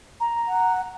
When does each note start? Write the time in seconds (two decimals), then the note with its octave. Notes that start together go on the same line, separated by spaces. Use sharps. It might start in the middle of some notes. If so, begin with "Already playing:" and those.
0.20 A#5
0.48 F#5